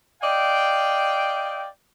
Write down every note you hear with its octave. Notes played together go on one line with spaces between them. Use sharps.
D5 D#5 F5 G5